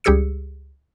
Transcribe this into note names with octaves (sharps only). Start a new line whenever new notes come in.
C#2 G3 G4 G#4 E6 C#7